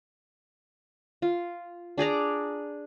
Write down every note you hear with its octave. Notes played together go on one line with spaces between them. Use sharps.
F4
D4 G#4 D5 A#5